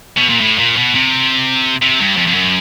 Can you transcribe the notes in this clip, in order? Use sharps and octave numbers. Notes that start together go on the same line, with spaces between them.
B2
A#2
A2
A#2
B2
C3
C3
G2
F2
F2
F#2